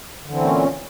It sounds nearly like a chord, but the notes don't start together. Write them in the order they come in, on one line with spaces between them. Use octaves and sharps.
D3 E3 C4 A#2 C#4